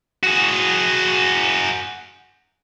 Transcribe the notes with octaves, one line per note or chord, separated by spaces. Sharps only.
F#4 G#4